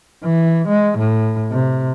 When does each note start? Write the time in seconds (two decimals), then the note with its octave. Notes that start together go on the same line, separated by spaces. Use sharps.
0.24 E3
0.68 G#3
0.98 A2
1.51 C3